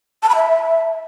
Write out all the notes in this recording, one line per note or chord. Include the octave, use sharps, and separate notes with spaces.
A5
B5
E5